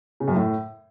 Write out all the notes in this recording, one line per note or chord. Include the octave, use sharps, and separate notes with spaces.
C#3
F#2
A2